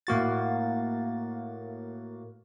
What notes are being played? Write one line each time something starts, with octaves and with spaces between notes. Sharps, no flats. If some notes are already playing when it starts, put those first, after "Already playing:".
A2 A#3 F#4 A6